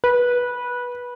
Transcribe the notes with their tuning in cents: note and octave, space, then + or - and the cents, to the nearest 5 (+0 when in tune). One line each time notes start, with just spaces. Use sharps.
B4 -15